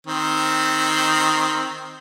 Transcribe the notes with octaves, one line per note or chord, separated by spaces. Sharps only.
D#3 C4